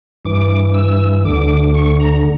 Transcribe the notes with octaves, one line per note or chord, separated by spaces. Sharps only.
G2 E3 D6
E6
D2 D3 D6
C#6
A#5